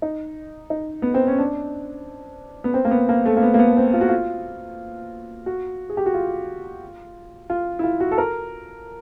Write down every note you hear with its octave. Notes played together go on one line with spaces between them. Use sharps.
D#4
D#4
B3
C4
C#4
D4
B3
C4
A#3
B3
A#3
A3
A#3
B3
A#3
B3
C4
F4
F#4
F4
F#4
G#4
G4
F#4
F4
F4
E4
F4
F#4
A4
A#4